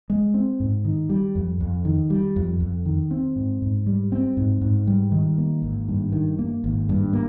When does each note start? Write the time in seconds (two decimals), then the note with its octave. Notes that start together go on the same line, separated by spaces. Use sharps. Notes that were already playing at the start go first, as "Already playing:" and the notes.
0.10 G#3
0.34 C4
0.60 G#2
0.85 D#3
1.09 G3
1.35 F2
1.60 F2
1.85 D#3
2.10 G3
2.36 F2
2.60 F2
2.85 D#3
3.11 C4
3.36 G#2
3.62 G#2
3.86 G3
4.12 C4
4.37 G#2
4.61 G#2
4.87 G3
5.12 D#3
5.38 A#3
5.62 G#1
5.88 G2
6.12 D#3
6.39 A#3
6.64 G#1
6.89 G2
7.13 A#3